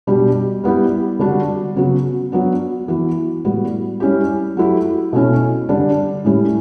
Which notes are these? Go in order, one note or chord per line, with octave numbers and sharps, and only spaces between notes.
B2 G3 D4 G4
G3 B3 E4 G4
D3 G3 D4 F#4
C#3 F#3 B3 F#4
F#3 B3 D4
E3 B3 F#4
A2 G3 B3 F#4
G3 C#4 E4 G4
F#3 A3 E4 G4
B2 A3 C#4 E4
D3 G3 D4 G4
A2 G3 C#4 E4 G4